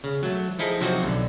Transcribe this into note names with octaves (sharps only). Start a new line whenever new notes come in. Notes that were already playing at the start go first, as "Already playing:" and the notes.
C#3
F#3 A3
F3 D#4 E4 G#4 A4
C3 F3 F#3 C4 D#4 F#4
B1 D3